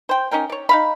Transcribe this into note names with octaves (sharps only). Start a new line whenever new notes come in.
C5 G5
C#4 D#4 A#4 G5
C#5 D5
D#4 F5 B5